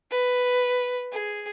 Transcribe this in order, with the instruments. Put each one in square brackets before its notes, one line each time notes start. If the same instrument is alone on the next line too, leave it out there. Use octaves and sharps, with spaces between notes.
[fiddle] B4
G#4